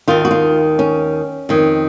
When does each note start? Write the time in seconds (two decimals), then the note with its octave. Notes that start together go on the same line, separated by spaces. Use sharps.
0.08 D#2 D#3 F4
0.25 F#4
0.31 F4
0.79 C#4
1.49 F2 D#3